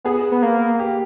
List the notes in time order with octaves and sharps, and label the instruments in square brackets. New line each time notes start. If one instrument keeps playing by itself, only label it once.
[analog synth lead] B3 [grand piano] G#4
[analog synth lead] B3
A#3
[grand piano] G4